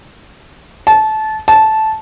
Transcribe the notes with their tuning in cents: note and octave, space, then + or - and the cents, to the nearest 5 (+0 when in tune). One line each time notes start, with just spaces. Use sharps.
A5 -20
A5 -10